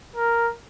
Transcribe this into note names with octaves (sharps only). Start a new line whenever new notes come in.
A#4